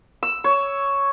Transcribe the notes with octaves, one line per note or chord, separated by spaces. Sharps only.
E6
C#5